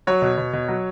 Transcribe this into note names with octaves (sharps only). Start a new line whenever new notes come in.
F#3 C#5
B2
B2
B2
F#3